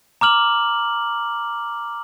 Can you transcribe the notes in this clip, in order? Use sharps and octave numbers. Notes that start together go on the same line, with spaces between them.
A#5 D6 F6 F#7